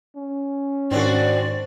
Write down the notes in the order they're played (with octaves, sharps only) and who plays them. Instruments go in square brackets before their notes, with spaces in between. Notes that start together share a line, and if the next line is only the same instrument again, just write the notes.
[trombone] C#4
[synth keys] G#2 D#3 [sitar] C4 D4 F#4 [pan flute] D5